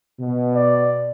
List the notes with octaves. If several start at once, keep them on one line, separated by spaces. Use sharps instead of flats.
B2
D5